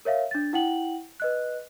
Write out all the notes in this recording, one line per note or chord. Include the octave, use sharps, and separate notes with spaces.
A#4 C#5 E5 F5
D4 A6
E4 F#5 G5 F#7
B4 D#5 F#6